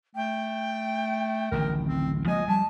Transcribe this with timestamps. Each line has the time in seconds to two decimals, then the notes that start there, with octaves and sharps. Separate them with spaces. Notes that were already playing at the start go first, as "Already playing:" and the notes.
0.15 A3 G5
1.52 D1 A1 D#3 A#4
1.85 C4
2.27 F3 G#3 A#3 D#5 G#5
2.48 G3 A5